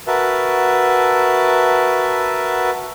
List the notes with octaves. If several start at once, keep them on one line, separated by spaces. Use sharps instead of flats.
F#4 A#4 B4 E5 A5